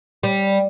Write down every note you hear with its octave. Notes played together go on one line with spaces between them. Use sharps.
G3